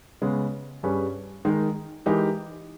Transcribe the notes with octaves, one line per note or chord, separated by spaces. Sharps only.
C#3 G#3 B3
G2 G3 C#4 G#4 B4
D#3 G#3 D#4 A#4
E3 G#3 D#4 G4 A#4